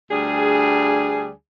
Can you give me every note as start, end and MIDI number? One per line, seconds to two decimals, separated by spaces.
0.11 1.30 38
0.11 1.30 55
0.11 1.30 62
0.11 1.30 68